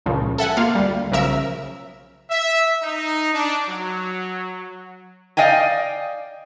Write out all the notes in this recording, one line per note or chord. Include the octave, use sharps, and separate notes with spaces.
C#2 A#2 C#3 F3
A4 E5 F#5 G#5
A#3 F4 F5
D2 G3
B1 C#3 F3 A#4 E5 E6
E5
D#4
D4
F#3
D5 D#5 F5 G5 G#5